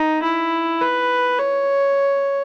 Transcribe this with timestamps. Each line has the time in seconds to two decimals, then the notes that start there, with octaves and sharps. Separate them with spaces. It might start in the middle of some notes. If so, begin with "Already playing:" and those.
Already playing: D#4
0.23 E4
0.81 B4
1.39 C#5